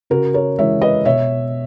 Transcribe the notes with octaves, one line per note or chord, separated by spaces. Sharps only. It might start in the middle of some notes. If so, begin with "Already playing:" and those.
C#3 F#4 A#4
A#4 C#5
E3 G#3 C#5 E5
B4 D#5
B2 C#5 E5